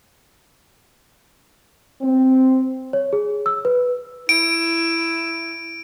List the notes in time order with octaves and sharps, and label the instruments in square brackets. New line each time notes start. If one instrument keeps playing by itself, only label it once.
[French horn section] C4
[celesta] C#5
G#4
E6
B4
[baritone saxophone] E4 [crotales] D7